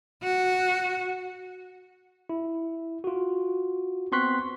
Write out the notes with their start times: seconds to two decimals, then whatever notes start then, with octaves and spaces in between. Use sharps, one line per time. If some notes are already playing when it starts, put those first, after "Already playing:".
0.23 F#4
2.29 E4
3.04 F4 F#4
4.12 B3 C4 C6 C#6 F#6 B6